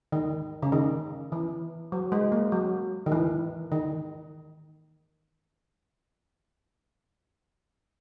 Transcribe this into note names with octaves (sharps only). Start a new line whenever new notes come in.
D#3
C#3
D#3
E3
F#3
G#3
A#3
F#3
D#3
E3
D#3